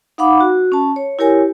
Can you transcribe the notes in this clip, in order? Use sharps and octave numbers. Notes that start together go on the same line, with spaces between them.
D#4 F5 F#5 B5 D6
F#4
C#4 A5
C#5
E4 G4 A#4 C#5 G#5